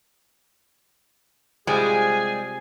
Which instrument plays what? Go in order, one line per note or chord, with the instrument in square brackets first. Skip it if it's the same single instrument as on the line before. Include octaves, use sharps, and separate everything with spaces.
[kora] C3 F4 [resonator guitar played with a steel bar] G3 G#3 [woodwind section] G#4 [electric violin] G#5